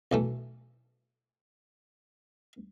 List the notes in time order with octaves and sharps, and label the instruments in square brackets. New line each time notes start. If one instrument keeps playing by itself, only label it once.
[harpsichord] B1 E3 A3